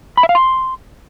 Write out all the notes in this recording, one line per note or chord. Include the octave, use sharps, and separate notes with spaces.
B5
E5
F5
C6